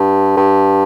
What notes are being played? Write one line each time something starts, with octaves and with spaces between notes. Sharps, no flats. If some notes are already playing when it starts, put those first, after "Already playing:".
Already playing: G2
G2